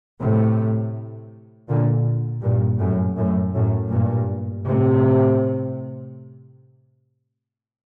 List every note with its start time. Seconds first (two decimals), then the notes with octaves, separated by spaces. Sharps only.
0.20 A2 C3
1.68 A#2 D3
2.43 G2 A#2
2.80 F#2 A2
3.17 F#2 A2
3.55 F#2 A2
3.92 G2 A#2
4.66 A2 C3